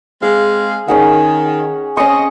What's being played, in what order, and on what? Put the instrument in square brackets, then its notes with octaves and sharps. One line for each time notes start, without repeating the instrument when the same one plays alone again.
[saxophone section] G#3 C4 F5 [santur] G#4
[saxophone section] D#3 [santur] C#4 G#4 F#5
[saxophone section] C4 D#5 [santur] C#4 C#6